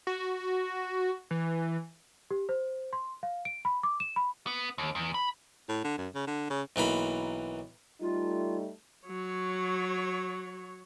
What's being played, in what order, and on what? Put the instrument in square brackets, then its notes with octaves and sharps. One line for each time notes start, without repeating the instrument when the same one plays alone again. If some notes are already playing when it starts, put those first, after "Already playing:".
[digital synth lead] F#4
E3
[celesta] G4
C5
C6
F5
D7
B5
D6
E7
B5
[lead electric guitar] B3
D#2
E2
B5
[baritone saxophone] A2
D3
F#2
C#3
D3
C#3
[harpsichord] B1 E3 A#3 B5
[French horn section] G3 A3 D#4 [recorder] F4
[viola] F#3 C#5